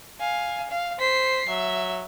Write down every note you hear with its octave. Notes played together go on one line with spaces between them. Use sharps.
F5 G#5
F5
C5 B6 C7
F#3 E5